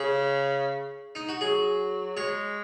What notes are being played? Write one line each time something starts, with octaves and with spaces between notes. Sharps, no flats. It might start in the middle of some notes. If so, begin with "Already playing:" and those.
Already playing: C#3 G#4
D#4
F#4
F#3 G#4
G#3 C#5